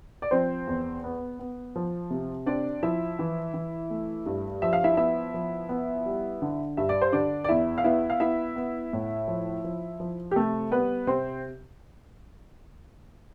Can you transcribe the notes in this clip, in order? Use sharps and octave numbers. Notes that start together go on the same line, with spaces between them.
D5
F3 C4 C5
E2
B3
B3
F3
C3
C4 D4 D5
F3 E4 E5
E3
E3
A3
G2
F3 E5
F5
E4 E5
B3 E4 E5
F3
B3
G3
D3
G2 E5
D5
C5
D3 D4 D5
D5
E2 E4 E5
F5
B3 E4 E5
F5
B3 E4 E5
B3
A2
F3
F3
F3
G4
C3 A3 A4
G3 B3 B4
C3 C4 C5